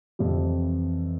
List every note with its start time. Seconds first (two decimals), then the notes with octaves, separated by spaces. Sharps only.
0.19 F2 C3 E3 G3
0.30 D3
0.42 E3